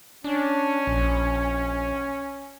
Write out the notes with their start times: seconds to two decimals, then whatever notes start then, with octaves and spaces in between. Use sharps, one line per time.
0.24 C#4 D4
0.87 A#1